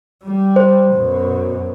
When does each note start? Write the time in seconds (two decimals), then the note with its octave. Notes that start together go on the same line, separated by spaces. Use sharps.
0.24 G3
0.56 C5
0.94 F#2 B2